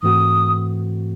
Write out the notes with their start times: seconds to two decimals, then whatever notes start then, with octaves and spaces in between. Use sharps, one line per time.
0.03 G#2 E3 A3 C4 F#4 D#6